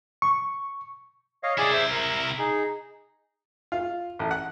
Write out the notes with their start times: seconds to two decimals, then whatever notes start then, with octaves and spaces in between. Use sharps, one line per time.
0.22 C#6
1.43 C#5 D#5 F5
1.58 C3 E4 G#4 D5 G#5
1.73 C5 E5 C6
1.91 A#4
2.39 D#4 G#4
3.72 F4
4.19 A1
4.31 F#5